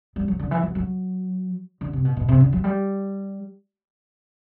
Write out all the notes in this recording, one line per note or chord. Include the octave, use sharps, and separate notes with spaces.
G3
F#3
D3
E3
F#3
F#3
D3
C3
B2
B2
C3
D3
F#3
G3